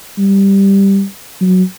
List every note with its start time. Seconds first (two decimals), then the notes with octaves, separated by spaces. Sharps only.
0.18 G3
1.41 F#3